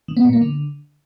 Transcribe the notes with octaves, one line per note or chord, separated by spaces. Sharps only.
D#3
B3
A#2
A#3
D3